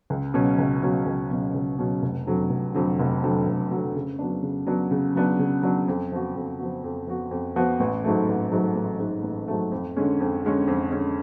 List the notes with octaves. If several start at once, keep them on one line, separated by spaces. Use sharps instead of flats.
C#2
B2 F#3 C#4
C#2
B2 F#3 C#4
C#2
B2 F#3 C#4
C#2
B2 F#3 C#4
F1
F2 D3 F#3
F1
F2 D3 F#3
F1
F2 D3 F#3
F1
F2 D3 F#3
C#3
F#3 B3 D4
C#3
F#3 B3 D4
C#3
F#3 B3 D4
C#3
F#3 B3 D4
F2
F3 B3 F#4
F2
F3 B3 F#4
F2
F3 B3 F#4
F2
F3 B3 F#4
A1
G#2 F#3 A3
A1
G#2 F#3 A3
A1
G#2 F#3 A3
A1
G#2 F#3 A3
F2
D3 G#3 C#4
F2
D3 G#3 C#4
F2
D3 G#3 C#4